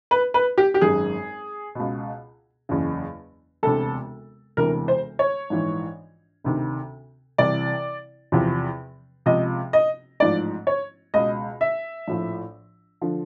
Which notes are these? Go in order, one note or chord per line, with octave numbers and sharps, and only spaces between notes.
B4
B4
G4
G4
G#1 F#2 D#3 G#4
C#2 B2
F#1 E2 C#3
E1 D2 C3 A4
E1 D2 C3 E3 A#4
C5
C#5
A#1 G#2 E3
D2 C3 D#3
C2 C3 E3 D5
E2 C3 F3
C#2 C3 F3 D#5
D#5
A1 G#2 F3 D5
C#5
C#2 B2 D#5
E5
A#1 A2 F3
D3 F3